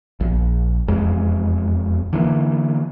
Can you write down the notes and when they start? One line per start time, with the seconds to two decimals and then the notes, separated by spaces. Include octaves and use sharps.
0.20 A#1
0.88 E1 F2 G#3
2.13 D3 E3 G#3 A#3